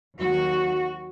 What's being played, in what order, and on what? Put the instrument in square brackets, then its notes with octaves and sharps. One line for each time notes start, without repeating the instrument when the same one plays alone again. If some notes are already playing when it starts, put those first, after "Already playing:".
[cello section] D#2 D#3 F#3 F#4